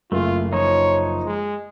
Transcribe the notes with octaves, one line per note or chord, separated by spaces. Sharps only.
F#1 A3 F4
F3 D#4 C#5
G#3